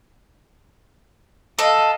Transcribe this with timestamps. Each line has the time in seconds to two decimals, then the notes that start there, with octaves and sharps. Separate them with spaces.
1.59 A4 D#5 F5